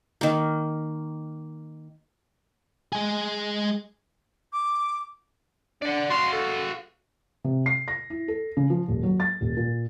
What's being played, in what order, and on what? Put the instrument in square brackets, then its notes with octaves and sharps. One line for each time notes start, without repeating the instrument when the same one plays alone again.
[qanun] D#3 A#3
[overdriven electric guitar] G#3 G#4
[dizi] D6
[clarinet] D4 [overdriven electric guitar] D5 F#5
[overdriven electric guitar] F#4 F5 [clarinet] C6
[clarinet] A4
[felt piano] C3
C7
A#6
E4
A4
C#3
F3
D#1
F#3
A6
D#1
A#2